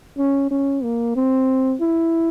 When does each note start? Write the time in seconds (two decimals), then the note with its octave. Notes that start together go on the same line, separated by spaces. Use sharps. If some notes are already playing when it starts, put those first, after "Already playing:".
0.18 C#4
0.51 C#4
0.83 A#3
1.16 C4
1.81 E4